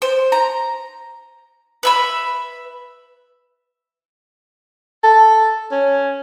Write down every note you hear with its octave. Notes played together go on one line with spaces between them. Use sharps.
C5
A#5
B4 E5 B5
A4
C#4